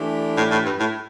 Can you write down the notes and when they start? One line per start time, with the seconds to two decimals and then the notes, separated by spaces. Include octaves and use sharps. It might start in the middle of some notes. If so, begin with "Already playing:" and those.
Already playing: E3 A3 D4 G4
0.37 A2
0.51 A2
0.65 G2
0.80 A2